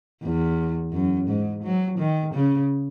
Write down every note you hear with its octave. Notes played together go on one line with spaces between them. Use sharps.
E2
F#2
G#2
F#3
D#3
C#3